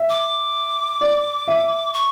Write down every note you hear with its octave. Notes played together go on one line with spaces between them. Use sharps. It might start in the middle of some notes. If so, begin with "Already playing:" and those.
Already playing: E5
D6
D5
E5
C#6